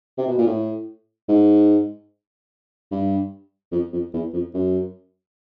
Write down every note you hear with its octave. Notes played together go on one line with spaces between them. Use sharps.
C3
B2
A#2
A2
G#2
G2
F2
F2
E2
F2
F#2